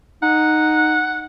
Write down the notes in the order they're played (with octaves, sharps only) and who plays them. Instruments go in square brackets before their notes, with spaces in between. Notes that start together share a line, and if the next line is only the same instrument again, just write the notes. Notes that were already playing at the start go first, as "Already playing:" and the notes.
[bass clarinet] D#4 [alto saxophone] F#5